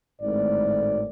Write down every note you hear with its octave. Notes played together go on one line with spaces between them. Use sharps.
G#1 A2 D5